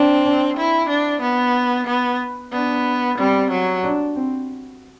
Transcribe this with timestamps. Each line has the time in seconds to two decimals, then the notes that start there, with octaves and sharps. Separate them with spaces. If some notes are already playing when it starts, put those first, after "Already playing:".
Already playing: C4 D4
0.57 E4
0.89 D4
1.22 B3
1.87 B3
2.52 B3 D4
3.18 G3 C4
3.51 F#3
3.83 D4
4.16 C4